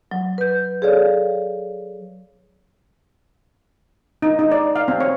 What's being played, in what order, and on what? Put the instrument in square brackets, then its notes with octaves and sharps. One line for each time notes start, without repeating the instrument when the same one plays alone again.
[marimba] F#3
B4 G6
G#4 A4 C#5 D5 F5
[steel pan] D#4
D#4
D5
F5
C4
C#5